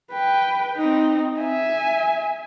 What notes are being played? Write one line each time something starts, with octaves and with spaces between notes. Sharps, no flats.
B4 G5
C4 D#4
E5 G#5